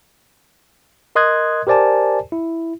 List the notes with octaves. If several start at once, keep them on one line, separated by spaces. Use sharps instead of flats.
A#4 D#5 C6 D#6 F#6 G#6
G4 A#4 C5 D5 G#5 A5
E4